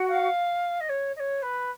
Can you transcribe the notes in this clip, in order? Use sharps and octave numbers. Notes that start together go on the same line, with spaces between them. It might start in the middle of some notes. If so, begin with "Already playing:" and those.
Already playing: F#4 F#5
F5
D#5
C#5
D#5
C#5
B4